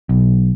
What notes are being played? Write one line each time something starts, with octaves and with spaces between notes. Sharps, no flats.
B1